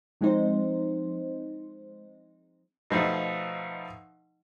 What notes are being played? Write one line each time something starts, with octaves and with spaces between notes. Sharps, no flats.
F3 G#3 C4 D#4 C5
B2 F3 A3 D#4